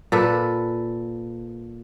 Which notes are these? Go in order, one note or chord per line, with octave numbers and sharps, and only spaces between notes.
A#2 A4 B4